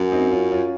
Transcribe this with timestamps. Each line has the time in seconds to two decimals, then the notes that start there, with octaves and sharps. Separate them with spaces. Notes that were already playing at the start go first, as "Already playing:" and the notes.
Already playing: F#2
0.12 C4 D#4
0.31 C#4 F4
0.52 C#4 F4